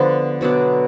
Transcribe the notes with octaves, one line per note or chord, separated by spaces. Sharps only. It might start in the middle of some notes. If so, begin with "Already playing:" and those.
Already playing: D3 F3 B3 D4
B2 F#3 B3 D4